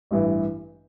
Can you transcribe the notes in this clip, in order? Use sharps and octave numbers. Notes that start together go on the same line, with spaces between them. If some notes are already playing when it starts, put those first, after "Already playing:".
A1 G2 E3